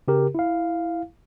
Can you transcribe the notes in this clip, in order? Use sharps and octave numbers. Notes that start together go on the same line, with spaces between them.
C#3 G4 A#4
E4 F5